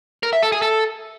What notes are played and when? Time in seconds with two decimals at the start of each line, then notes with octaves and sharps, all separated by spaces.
0.23 A#4
0.33 E5
0.43 A4
0.52 G#4
0.62 A4